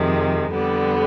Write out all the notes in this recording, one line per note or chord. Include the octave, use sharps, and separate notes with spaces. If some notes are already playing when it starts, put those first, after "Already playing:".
Already playing: F2 C3 D#3 G#3
F2 D3 G3 B3